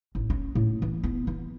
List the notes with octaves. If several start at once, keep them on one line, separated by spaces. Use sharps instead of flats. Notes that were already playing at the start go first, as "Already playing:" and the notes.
A1
C#4
A2
E3
B3
E3